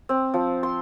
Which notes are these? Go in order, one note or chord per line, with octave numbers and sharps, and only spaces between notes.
C4
F3
C6